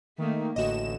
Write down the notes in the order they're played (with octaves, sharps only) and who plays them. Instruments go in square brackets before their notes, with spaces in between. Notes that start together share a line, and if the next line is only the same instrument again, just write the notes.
[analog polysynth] D#3 [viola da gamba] A3 A#3
[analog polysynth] A1 E7 [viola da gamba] D3 [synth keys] F#4 D#5